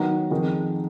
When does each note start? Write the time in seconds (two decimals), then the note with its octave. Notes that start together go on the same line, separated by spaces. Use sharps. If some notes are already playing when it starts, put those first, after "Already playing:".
Already playing: D#3 F#3 B3 D#4 F#5 A#5
0.31 F2 D#3 G#3 D#4